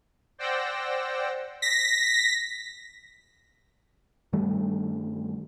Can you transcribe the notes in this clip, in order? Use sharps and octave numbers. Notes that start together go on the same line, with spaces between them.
C5 D5 F#5 G5 E6 A#6
A#6 B6
G2 D#3 G3 A3